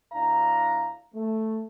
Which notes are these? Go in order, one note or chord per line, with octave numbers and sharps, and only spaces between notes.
D2 D4 E4 F5 A#5
A3